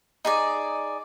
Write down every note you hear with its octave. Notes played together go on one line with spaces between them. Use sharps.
D#4 G#4 D5